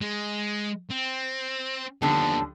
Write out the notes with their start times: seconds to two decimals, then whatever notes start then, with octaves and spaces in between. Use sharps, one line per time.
0.01 G#3
0.90 C4
2.02 D#2 D3 F3 G3 B3 A5